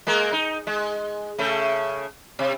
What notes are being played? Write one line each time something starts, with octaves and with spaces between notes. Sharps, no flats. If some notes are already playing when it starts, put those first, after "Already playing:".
G#3 A#3 A#4
D#4
G#3
C#3 A3
C3